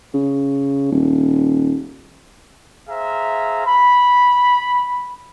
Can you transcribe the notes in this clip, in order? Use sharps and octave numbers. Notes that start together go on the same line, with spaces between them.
C#3
D#1
G#4 C5 E5 F5 A#5
B5